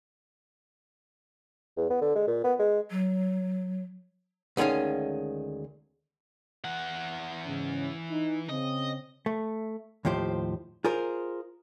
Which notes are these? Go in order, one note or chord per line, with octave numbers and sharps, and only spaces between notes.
E2
B3
D3
G#3
A#2
B3
G#3
F#3
D2 D#3 G#3 C#4 F5
E3 F#5
G#2 C#3 C#4
D#4
C#3 C4 D#5
A3
D#2 A2 F3 G4 C5
F4 G#4 A#4 C5